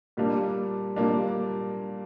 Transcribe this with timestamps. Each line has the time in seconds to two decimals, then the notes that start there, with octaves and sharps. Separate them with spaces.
0.17 A#2 G3 A#3 D4
0.96 A#2 G3 A#3 D4